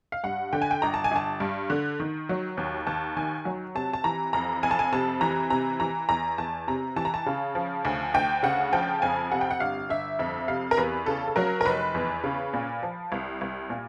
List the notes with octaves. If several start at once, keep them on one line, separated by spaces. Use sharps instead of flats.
F5
G2 F#5
D3 G5
G#5
G5
G1 A#5
A5
G#5
G1 A5
G2
D3
D#3
F#3
D#2
D#2 A5
D#3 G#5
F#3
C3 A5
A5
E3 A#5
F2 A#5
F2 G#5
A5
G#5
C3 A5
E3 A#5
C3 A#5
E3 A#5
E2 A#5
E2 A5
C3 A#5
E3 A5
A#5
A5
C#3
F3
D2
D2 G5
C#3 F#5
F3 G5
F2 G#5
C3 F#5
G5
F#5
G1 F5
G1 E5
F2 E5
C3 F5
A#4
E2 B4
C#3 A4
A4
F#3 A#4
A#4
F1 B4
E2
C#3
A#2
F3
C2
C2
A#2